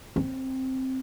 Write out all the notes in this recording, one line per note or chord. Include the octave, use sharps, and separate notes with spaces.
C4